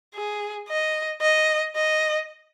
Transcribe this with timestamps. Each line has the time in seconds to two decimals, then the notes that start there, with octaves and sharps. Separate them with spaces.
0.15 G#4
0.68 D#5
1.21 D#5
1.75 D#5